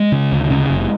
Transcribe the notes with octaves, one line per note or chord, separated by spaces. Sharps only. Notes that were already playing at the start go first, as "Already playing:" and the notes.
Already playing: G#3
C#3
D2
C#3
F#1